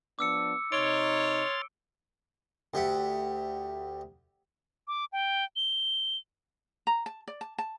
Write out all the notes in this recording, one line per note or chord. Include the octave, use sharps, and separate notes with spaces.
F3 B3 D4 D6 E6 C#7
C3 D#4 C#5 C6 F6 A6 D7 G7
D2 G4 E5 F#5
D6
G5
G7
A#5
A5
D5
A5
A5